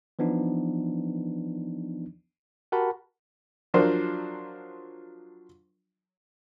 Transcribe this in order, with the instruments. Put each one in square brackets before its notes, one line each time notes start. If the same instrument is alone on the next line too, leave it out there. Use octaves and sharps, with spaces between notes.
[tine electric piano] E3 F3 B3 D4 D#4
F#4 G4 A#4 F#5 A5 B5
[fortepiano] F3 F#3 D4 F4 A#4 C5